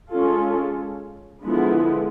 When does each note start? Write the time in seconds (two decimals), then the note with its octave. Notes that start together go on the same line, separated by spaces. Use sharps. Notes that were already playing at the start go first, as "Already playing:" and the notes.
0.10 G#3 C#4 F4 A4
1.43 D3 F3 G#3 B3 E4